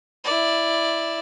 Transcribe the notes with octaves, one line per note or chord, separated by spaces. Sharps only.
E4 D5